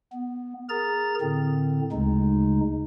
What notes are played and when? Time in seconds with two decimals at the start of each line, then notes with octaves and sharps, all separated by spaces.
0.12 B3
0.69 G#4 A#4 A#5 A6
1.21 A2 D3 C4
1.92 D2 C#3 G#3 D#4